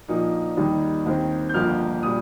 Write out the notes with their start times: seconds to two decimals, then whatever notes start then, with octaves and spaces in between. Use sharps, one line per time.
0.08 A#1 A#2 F3 A#3 D#4
0.57 D#2 D#3 G3 D#4
1.06 D#2 D#3 C4
1.49 G6
1.54 G1 F2 F3 A#3 F6
2.03 A#2 G3 D#6